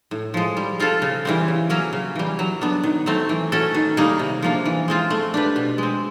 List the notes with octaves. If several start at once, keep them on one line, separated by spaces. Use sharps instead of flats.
A2
F3 G#3
G3
C4 F4 A4
C#3
E3 G3 C4
C#3
F#3 A#3 C#4 F#4
C#3
E3 G3
F#3
B3 D4
D#3
F#3 A3 C4
E3
A3 C#4 F#4 A4
D#3
G3 A#3 D#4 G#4
C3
F3 A#3 D4
E3
G#3 C4 F4
A3
D4 G4 B4
B2
G#3 C4